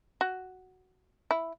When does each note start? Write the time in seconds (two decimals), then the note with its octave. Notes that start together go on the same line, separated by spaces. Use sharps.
0.21 F#4
1.31 E4